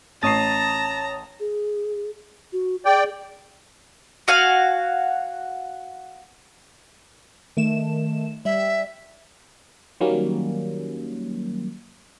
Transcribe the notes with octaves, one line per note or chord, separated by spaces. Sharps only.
A1 C#5 A5 A#5 D#6 A6 C7
G#4
F#4
G#4 D5 G5
F#4 F5 G#5
D#3 A3 E7
G3 E5
D#3 F#3 G3 A#3 C#4